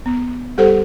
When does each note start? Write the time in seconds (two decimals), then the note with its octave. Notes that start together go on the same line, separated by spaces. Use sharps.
0.06 B3
0.58 G3 G4 A4 C5 F#5